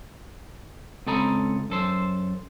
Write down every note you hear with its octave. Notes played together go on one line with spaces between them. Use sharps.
C#2 C4 A4 D#5 A#5 B5
F#2 A4 C5